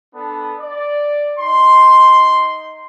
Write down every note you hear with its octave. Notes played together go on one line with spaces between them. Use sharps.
B3 D4 A4
D5
D#4 C6